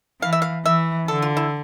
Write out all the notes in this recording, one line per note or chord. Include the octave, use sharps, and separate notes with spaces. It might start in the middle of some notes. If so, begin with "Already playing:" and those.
E3 F5
E5
F5
E3 E5
D3 A4
F4
E4